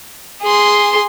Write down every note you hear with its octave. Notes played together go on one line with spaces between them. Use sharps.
G#4 C6